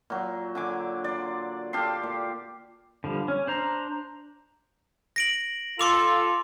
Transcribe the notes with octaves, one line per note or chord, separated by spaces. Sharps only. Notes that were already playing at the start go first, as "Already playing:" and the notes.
A#2 F#3
D3 G#5 D6
D5 C6
G4 A4 F5 C6
A#2
D3 F3 G3
C#4
D4 C5 A#5
A#6 D7 F#7
F4 A4 C6 D6 F7